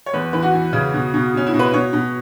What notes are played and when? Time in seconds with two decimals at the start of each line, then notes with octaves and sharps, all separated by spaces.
0.06 C#5
0.13 E2 B4
0.33 E3 B4
0.43 F#4
0.53 E3
0.73 C#3
0.94 B2
1.14 B2
1.34 B2 C#4
1.47 E4
1.54 B2
1.59 B4
1.73 B2 C#5
1.93 B2